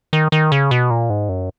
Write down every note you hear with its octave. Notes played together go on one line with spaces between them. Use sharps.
D#3
D#3
C#3
B2
A#2
G#2
F#2